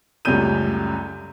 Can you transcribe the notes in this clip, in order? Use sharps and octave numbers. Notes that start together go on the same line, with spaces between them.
C#2 F#2 G3 A3 G6 D#7